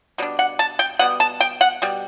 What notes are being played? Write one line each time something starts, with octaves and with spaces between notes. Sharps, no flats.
B2 G3 D4
F#5
A5
G5
B2 G3 B3 F#5
A5
G5
F#5
B2 G3